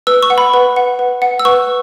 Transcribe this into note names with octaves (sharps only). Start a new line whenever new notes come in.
B4 E6
C#6
F#5
B5
B4
F#5
B4
F#5
E6
B4 C#6